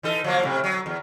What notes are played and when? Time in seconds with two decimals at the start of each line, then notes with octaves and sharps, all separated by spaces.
0.03 E3 D#4 A4
0.24 F3 F#3 A#3
0.43 A2 C3
0.64 F#3
0.86 E2